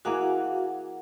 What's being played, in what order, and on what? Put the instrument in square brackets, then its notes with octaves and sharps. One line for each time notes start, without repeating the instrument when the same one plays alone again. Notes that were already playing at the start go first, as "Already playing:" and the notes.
[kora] E3 A#3 G#4 [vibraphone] F#4 F5 F#5